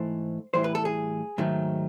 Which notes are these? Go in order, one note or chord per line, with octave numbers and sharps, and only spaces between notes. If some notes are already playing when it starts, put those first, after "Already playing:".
Already playing: G#2 E3 A3 C5
A2 E3 G3 C5
B4
A4
G#4
G#2 D#3 F#3 A3